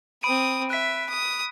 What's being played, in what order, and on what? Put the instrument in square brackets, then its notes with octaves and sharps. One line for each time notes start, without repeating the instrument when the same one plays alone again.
[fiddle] C4 D#6 [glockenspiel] B5 D7 D#7
[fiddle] E5 [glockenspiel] F#6 B6
[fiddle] D#6